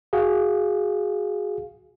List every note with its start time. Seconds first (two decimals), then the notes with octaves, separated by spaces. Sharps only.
0.13 F#4 G#4 F5